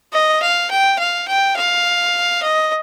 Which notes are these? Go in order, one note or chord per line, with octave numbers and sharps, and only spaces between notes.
D#5
F5
G5
F5
G5
F5
D#5